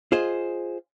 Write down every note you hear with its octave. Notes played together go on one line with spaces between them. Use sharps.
F4 G#4 C5 D#5